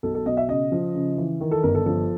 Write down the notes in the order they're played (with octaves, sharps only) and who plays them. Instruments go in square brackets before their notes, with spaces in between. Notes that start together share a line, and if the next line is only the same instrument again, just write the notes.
[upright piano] B1 A4
A4
B2 D#5
E5
C#3 D#5
F3
C#3
E3
D#3
A4
G1 A#4
A4
F3 A4